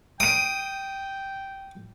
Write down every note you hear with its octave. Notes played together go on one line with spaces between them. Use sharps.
G5 D#6 D7 D#7